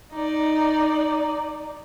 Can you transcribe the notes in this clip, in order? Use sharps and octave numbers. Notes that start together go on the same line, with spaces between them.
D#4 D5